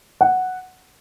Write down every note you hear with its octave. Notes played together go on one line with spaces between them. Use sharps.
F#5